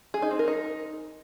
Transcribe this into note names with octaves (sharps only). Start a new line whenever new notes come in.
G#4
D#4
C4
A#4
D#4